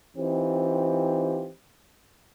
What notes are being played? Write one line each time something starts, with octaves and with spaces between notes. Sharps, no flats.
E3 C4 D#4 F4 G4